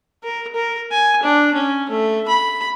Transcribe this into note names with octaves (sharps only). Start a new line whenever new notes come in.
A#4
A#4
G#5
D4
C#4
A3
B5